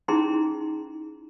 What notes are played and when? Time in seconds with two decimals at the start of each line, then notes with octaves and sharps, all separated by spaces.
0.08 C#4 D#4 E4 G#4 A#5 C6